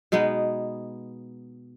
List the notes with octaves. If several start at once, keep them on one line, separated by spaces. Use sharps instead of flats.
B2 G#3 B3 D#4